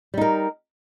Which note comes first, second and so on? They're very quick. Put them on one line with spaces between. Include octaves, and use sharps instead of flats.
G3 D#4 A#4